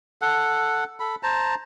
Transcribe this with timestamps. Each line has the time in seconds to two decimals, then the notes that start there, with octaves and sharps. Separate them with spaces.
0.22 A4 F#5
1.00 A4 B5
1.23 C5 A5 A#5